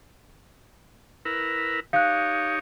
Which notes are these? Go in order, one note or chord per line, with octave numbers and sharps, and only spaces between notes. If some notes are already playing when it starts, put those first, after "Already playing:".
E4 A#4 B4
D#4 G4 C#5 F5 F#6